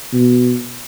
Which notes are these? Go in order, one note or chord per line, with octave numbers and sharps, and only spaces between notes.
B2